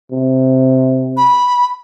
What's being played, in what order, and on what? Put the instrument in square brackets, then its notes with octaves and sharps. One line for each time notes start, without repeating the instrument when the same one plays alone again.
[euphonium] C3
[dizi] B5